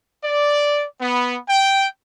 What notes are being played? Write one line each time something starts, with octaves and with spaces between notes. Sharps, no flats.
D5
B3
G5